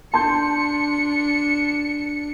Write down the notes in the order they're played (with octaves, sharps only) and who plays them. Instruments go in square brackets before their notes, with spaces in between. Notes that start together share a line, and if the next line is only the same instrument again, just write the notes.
[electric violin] D4 C#7 [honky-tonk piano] A5 C6 G6